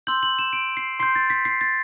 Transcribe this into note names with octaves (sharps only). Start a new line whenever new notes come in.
C6 E6 G6 F#7
F#7
E7
D7
C7
C6 G6 C7
A6
B6
C7
A6